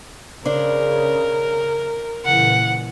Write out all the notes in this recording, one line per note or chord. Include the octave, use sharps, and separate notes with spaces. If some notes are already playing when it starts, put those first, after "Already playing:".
C#3 D4 A#4 C5
A#2 C#3 E3 F#5